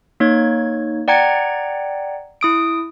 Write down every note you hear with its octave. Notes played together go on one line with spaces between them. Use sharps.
A#3 D#4 C#5 G#6
D5 F#5 G5 A#5 G#6 C#7
E4 D#6 D7